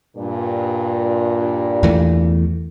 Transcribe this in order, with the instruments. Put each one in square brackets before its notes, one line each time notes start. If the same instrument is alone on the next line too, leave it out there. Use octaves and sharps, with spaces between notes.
[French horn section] G2 A#2
[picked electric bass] E2 E3 A3